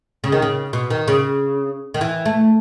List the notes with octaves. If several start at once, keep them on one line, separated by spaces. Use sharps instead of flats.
C#3
D#3
C#3
B2
D#3
C#3
D#3
E3
A3